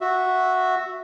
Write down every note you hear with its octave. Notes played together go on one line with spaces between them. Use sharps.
F#4 E5